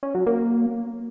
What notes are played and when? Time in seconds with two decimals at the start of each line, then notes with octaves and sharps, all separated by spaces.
0.03 C#4
0.15 F#3
0.26 A#3